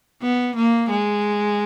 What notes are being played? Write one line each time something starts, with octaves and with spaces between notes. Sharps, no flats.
B3
A#3
G#3